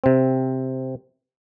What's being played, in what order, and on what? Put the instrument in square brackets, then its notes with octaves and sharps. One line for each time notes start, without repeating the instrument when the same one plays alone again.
[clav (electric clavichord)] C3 C4